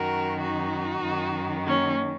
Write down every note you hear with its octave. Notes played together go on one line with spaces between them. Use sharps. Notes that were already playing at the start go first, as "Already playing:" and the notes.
Already playing: F#2 D#3 F#4 A#4
D#4 F#4
F#2 D#3
A#3 C#4